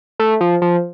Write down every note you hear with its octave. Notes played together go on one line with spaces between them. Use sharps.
A3
F3
F3